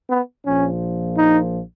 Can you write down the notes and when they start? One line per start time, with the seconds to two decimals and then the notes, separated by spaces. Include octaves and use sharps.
0.10 B3
0.45 A#1 A#2 F3 C#4
1.17 D#4